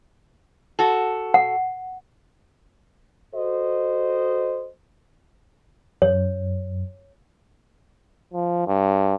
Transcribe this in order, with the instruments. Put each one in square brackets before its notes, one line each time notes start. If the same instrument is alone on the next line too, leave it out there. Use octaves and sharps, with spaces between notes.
[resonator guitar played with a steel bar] F#4 A4
[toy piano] F#5
[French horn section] F#4 A4 C5 D#5
[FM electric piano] F#2 [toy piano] C#5
[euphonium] F3
G2